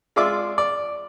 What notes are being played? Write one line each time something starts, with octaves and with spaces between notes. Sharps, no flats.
G#3 F4 D5 E5 D6
D5